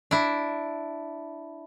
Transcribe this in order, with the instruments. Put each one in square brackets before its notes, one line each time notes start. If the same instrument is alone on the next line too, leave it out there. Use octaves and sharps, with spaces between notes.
[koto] D4 E4